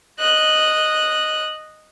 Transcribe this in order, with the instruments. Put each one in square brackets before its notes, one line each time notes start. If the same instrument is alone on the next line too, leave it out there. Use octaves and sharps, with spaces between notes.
[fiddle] D#5 F#6